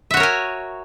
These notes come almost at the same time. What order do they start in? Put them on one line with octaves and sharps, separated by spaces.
E5 F#4 C#5 A#4 G#5